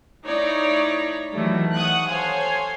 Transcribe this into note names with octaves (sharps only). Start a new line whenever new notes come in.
A3 D#4 E4 C#5 D5
D#3 E3 F#3 G3 A3 E4
F#5 C#6 D#6 F#6
A4 C5 C#5 F5 G#5